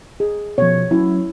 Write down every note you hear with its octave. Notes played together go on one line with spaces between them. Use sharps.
G#4
B2 F3 C#5
F#3 C#4 E4